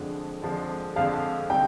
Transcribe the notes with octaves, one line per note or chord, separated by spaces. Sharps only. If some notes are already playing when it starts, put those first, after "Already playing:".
Already playing: F2 D3 F3 G#3 D4
F2 D3 F3 G#3 D4
F2 D3 F3 G#3 D4 F5
D3 G3 C4 D#4 G5